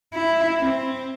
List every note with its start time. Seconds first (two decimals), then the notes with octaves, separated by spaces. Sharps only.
0.14 E4
0.60 C4